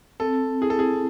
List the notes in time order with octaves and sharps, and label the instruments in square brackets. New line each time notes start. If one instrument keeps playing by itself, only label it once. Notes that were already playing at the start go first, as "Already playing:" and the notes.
[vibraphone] C4 [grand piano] A4
[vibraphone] E4 [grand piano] G#4
[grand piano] A4
G#4